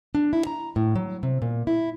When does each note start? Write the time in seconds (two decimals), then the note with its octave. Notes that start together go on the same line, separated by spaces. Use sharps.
0.15 D4
0.33 E4
0.47 A#5
0.76 A2
0.96 F#3
1.23 C3
1.42 A#2
1.67 E4